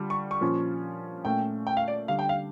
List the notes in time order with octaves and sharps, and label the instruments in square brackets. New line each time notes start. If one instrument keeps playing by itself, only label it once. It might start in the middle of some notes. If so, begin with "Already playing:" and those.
Already playing: [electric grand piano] D3 G3 D4 F4
[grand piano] C#6
C#6
[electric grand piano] A#2 F3 C#4 F4
[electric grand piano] A#2 A3 C#4 [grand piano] G5
[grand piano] G5
F5
D5
[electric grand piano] D3 G3 D4 [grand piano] F5
[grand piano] G5
F5